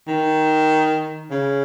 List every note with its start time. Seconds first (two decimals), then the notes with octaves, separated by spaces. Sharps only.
0.07 D#3
1.31 C#3